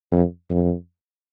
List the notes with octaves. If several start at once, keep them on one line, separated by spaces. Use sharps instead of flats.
F2
F2